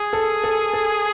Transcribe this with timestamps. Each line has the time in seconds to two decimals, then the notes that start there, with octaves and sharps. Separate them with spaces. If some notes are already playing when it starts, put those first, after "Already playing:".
Already playing: G#4
0.13 A4
0.44 A4
0.73 A4